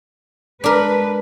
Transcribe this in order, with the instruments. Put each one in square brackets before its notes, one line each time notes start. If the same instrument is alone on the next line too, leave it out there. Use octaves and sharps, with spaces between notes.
[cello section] G#3 B4 [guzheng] D4 A#4